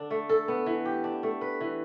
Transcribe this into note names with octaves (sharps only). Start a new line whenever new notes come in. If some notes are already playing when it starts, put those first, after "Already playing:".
Already playing: D3 D4
A3
A4
B3
E3
G4
D4
A3
B4
E3